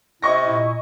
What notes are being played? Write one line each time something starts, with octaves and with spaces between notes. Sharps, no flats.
C3 E4 D#5 C#6 A#6
A#2 E4